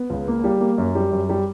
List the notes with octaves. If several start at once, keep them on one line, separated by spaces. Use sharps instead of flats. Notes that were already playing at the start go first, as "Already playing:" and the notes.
Already playing: B3
C#2
A#3
G3
A#3
F#2
G3
F#2
G3